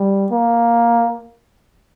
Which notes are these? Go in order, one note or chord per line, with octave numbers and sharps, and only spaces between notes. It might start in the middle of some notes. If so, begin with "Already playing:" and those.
Already playing: G3
A#3